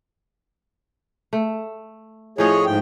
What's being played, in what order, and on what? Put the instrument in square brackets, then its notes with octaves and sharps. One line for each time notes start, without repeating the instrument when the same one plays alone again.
[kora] A3
[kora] A2 F3 C#4 [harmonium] G#4 C#5 D#5
[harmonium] G#2 G5